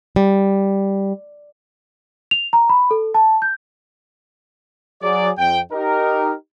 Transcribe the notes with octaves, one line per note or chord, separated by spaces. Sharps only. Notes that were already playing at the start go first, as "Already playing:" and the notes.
G3
F7
A#5
B5
A4
A5
G6
F#3 G#4 D5
F2 G5
D#4 G4 A#4